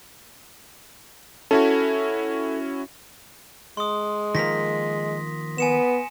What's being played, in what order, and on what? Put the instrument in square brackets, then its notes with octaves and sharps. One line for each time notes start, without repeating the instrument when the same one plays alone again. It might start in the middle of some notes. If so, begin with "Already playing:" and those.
[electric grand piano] C#4 E4 F#4 [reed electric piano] A4
[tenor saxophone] G#3 [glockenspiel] C6 D#6
[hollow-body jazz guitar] D#3 F3 A#3 [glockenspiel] A#6 B6
[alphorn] B3 [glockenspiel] G#5 C#7 E7